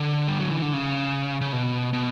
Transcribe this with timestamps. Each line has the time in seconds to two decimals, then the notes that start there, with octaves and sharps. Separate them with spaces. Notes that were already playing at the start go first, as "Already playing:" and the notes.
Already playing: D3
0.28 G3
0.40 F#3
0.50 E3
0.62 D3
0.73 C#3
1.41 C#3
1.53 B2
1.93 B2